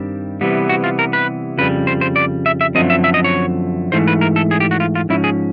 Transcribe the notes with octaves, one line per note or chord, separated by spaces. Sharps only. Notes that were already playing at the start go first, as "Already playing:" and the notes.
Already playing: G2 D#3 G3 C4
C3 E3 G3 B3
F#4
F4
A#4
B4
F2 C#3 G3 B4
C5
C5
D5
E5
E5
F#2 D3 F3 A3 C4 D#5
E5
E5
D#5
C#5
G#2 E3 A3 C5
B4
A#4
A4
G#4
G4
F#4
F4
F4
G#2 F3 C#4 E4
G#4